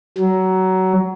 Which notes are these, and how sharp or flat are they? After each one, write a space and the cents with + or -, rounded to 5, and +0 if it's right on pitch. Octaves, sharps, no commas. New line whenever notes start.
F#3 +20